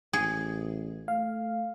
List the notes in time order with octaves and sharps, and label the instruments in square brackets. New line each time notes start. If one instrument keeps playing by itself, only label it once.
[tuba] A1 [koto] G#4
[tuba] A3 [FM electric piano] F5